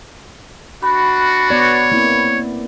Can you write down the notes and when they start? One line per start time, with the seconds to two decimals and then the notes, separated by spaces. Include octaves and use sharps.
0.83 D4 F#4 B5
1.50 B3 C#5 D5
1.92 A#3 C4 E4